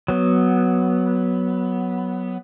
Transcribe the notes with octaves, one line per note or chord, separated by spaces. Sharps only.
F#3 B3